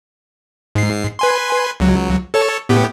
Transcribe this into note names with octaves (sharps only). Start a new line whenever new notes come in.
G#2 C7
B4 G#5 C6
C#2 F#3
A4 C#5 A5
A2 B3 G4